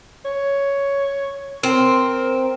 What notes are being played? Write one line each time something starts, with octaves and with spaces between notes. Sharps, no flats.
C#5
C4 A#4